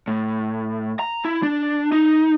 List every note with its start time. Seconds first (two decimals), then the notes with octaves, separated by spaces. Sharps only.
0.08 A2
0.99 A#5
1.25 E4
1.43 D4
1.92 D#4